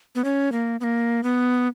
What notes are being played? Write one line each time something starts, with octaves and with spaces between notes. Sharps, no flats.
B3
C#4
A#3
B3
A#3
B3